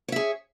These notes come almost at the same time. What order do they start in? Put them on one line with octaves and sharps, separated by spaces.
C#5 E5 G#4